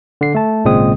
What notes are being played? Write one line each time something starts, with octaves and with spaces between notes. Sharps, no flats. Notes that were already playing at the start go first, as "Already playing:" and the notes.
D3 C7
A3 A5
G#1 A#2 C#3 G#3 C4 D#6